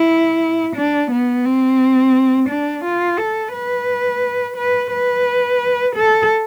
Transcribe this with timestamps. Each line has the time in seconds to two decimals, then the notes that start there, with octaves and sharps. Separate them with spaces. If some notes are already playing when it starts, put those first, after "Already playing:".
Already playing: E4
0.76 D4
1.11 B3
1.45 C4
2.49 D4
2.84 F4
3.18 A4
3.53 B4
4.56 B4
4.92 B4
5.96 A4